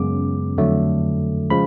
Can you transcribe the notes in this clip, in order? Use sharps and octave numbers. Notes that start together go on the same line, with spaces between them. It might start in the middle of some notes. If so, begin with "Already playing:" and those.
Already playing: F#2 C#3 G#3 B3 D6
F2 D3 F#3 A3
C#3 F3 G#3 B5